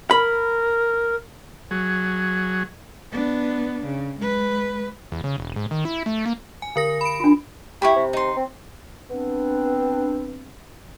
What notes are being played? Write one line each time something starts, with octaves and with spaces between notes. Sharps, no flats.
A#4 B5
F#3 G#4
B3 D4
C#3
G#3 B4
E2
C#3
E1
G#2
D#3
E4
A3
A#3
G#5
D3 A#4 A#6
B5 D7
D4 F4
E4 G4 C#5 B5
C3
D#4 C6
C4
B3 C4 D4